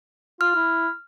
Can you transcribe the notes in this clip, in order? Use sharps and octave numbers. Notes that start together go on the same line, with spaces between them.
F4 F6
E4